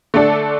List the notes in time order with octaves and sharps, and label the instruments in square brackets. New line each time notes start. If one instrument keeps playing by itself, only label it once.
[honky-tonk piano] D3 A3 D4 A4